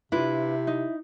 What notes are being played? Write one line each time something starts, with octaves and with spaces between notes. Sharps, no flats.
C3 D4 E4 F4 B4
D#4